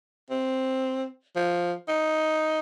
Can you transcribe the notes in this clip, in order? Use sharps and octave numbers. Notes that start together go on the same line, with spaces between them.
C4
F3
D#4